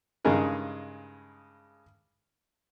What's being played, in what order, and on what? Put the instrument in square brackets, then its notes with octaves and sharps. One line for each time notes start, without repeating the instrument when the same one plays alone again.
[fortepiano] G2 C#3 G#3 D#4 G#4 A#4